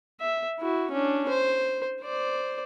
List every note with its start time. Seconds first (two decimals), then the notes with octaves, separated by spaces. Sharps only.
0.21 E5
0.60 E4 F#4
0.91 C#4 D4
1.29 C5
2.02 C5 D5